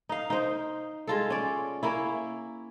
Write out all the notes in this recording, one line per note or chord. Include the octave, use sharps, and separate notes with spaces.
D#4 F5
D#4 C5
G#3 F4 A4
C#4 D5
A#3 C#4 E4